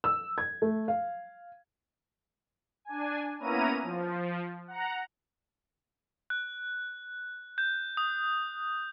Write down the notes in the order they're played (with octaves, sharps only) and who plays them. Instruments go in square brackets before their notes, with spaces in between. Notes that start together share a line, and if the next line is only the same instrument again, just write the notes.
[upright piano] E6
G#6
A3
F5
[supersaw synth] D4 G#5
A#3 B3 C#4 E4 A#5 D#7
F3
F#5 A#5
[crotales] F#6
G6
D#6